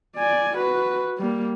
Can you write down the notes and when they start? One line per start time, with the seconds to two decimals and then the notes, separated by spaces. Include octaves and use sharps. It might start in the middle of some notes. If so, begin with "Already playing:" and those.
0.16 D5 G#5
0.56 F#4 B4
1.18 G3 A#3